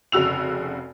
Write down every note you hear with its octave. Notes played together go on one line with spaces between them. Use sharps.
F1 C#3 F#4 E6 F7